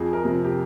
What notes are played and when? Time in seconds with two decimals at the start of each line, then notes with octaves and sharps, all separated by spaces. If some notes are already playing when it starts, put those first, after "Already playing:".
Already playing: F2 G#4
0.13 A#4
0.25 C3 F3
0.44 G4